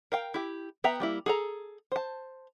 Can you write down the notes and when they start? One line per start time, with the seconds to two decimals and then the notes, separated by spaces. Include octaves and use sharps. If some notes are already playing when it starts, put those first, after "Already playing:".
0.12 A#4 F5 G5
0.34 E4 G4
0.84 B3 E5 G5 A#5
1.00 G3 A#3 E4
1.26 G#4 A4 A#5
1.92 C5 A5